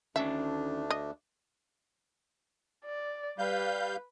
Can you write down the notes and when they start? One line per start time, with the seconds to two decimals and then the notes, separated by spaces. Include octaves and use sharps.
0.16 D2 D#3 A3 C#4 D4 E5 A5
0.90 D#5
2.85 D5
3.38 G3 B4 F5 G6